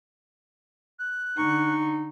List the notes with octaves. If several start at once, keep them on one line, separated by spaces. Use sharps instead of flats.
F#6
D3 D#4 C#6